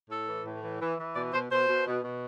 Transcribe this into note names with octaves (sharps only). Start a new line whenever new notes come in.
A2 A4
E3
A2
E3
E3
E3
B2 D5
B2 C5
B2 C5
B2
B2
B2